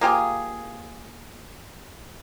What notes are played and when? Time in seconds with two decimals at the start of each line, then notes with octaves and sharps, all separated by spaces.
0.01 A#3 F4 G4 G#4